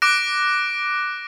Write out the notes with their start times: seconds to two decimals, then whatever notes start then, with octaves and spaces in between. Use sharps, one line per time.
0.02 D6 F#6 A#6 D7